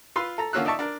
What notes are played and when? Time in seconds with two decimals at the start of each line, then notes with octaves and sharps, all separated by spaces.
0.16 F4 B4 C6 E6
0.38 A4 A#5
0.53 D3 A#3 C#4 F4 E6 F#6
0.65 D#4 D5 E5 A5 C#6
0.79 D4 A#4